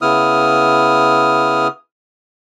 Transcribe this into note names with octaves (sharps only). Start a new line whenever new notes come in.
C#3 B3 E4 D#6 F6